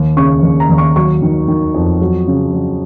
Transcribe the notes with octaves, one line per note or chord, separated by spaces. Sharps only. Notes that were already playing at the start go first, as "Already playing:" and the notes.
Already playing: D#2
C#3 C#6
D#2
A#5
D#2
C#6
F#3 C#6
D#3
D#3
F2
F#3
C#3
F#3